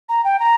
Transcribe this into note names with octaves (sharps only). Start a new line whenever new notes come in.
A#5
G5
A#5